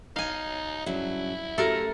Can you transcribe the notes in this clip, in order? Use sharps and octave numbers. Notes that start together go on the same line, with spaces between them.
D#4 F5 G#5
G2 C#3 F#3 E4
F#2 A3 F#4 G4 A4 A#4 E5